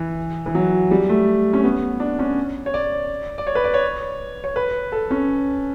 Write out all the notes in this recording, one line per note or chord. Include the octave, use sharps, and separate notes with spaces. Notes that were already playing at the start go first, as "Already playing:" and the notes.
Already playing: E3
E3
F#3
G3
A3
C#4
B3
D4
C#4
C#5
D5
D5
C#5
B4
D5
C#5
C#5
B4
A4
C#4